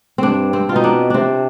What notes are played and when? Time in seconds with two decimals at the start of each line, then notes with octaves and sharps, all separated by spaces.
0.18 G2 C4 D4
0.53 C4
0.69 B2 F4
0.76 D#4
0.84 D4
1.10 C3 C4 D4